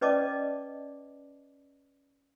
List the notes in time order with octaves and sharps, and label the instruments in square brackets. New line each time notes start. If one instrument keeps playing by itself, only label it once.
[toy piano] C#4 B4 D5 D#5 A5 D6